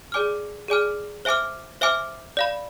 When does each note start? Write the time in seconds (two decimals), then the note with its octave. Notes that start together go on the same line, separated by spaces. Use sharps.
0.12 G#4 D5 G#5 D6 F6
0.68 G#4 D5 G#5 D6 F6
1.25 C5 E5 G#5 D6 F6
1.81 C5 E5 G#5 D6 F6
2.37 D5 F5 B5